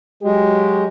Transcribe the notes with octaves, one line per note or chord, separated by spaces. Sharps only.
F#3 G#3 F#4 G4